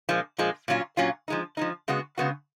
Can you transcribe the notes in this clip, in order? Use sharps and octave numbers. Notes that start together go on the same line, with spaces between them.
A#2 F3 G#3
A#2 F3 G#3
A#2 F#3 C#4 F4
A#2 F#3 C#4 F4
F3 G#3 D#4
F3 G#3 D#4
C#3 G#3 B3 F#4
C#3 G#3 B3 F#4